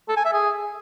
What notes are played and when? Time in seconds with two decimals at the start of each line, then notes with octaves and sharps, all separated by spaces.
0.09 A4
0.17 G#5
0.25 E5
0.33 G#4